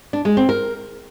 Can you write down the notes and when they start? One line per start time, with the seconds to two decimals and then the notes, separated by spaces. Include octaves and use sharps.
0.13 D4
0.25 G#3
0.37 C4
0.49 A#4